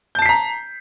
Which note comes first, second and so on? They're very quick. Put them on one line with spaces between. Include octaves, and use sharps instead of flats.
G6 A5 C7 B6 A#5